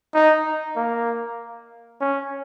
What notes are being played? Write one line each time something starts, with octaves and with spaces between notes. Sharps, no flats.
D#4
A#3
C#4